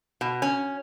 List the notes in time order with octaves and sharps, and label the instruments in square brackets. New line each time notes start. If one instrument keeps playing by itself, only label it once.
[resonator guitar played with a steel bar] B2
C#4